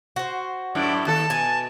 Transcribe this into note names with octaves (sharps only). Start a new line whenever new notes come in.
F#4 C5
F#2 A2 E4 D5
D#2 A4 A5
B2 G#5